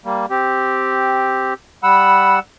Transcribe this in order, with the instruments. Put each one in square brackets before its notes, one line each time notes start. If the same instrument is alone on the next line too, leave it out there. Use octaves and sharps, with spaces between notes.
[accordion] G3 A#3
C4 G4
[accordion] G3 F#5 E6 [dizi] B5